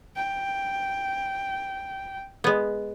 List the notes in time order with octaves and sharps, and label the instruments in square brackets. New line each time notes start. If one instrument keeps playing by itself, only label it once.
[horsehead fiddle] G5
[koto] G#3 B3